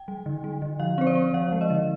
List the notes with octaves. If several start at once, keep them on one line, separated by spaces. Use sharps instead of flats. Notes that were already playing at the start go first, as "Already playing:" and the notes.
Already playing: G5
G3
D3
G3
D3
F3 F5
C4 C5
D5
C4
F3 F5
G#3
D#5
D3